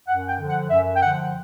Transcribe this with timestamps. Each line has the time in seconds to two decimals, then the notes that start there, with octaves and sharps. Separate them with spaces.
0.07 F#2 F#5
0.28 G5
0.39 D3 F3
0.49 F#5
0.70 F#2 E5
0.96 G5
1.02 D3 F3 F#5